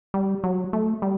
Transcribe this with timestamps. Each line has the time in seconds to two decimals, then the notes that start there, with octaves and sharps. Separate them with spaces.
0.14 G3
0.44 F#3
0.73 A3
1.02 G3